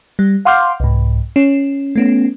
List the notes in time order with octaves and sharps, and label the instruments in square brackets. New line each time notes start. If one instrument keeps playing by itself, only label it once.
[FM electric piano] G3
F5 F#5 C6 D6 F6 G6
C2 G#2
C#4
A3 B3 C#4